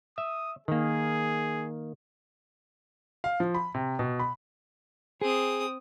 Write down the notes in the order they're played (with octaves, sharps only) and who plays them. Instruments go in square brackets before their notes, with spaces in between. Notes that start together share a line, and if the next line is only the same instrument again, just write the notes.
[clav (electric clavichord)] E5 [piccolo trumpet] D#6
[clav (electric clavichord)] D#3 A#3 [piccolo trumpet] G#4
[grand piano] F5
F3
B5
C3
B2
B5
[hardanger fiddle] C4 D#6 [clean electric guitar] G#4